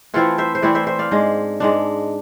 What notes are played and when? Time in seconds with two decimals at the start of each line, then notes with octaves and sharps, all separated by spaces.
0.14 E3 A3 C4 E4 F4 A4
0.38 C5 E5
0.55 C5
0.62 E3 A3 C4 E4 B4 D5
0.75 C5 E5
0.87 C5 E5
0.99 D5 F5
1.11 G#2 G#3 D4
1.60 G#2 G#3 D4